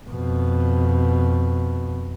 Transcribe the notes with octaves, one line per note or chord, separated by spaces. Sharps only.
F2 B2